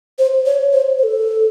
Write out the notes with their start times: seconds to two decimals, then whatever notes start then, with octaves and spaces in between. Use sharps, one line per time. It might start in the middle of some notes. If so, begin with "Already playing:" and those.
0.19 C5
0.46 C#5
0.73 C5
0.98 C5
1.03 A4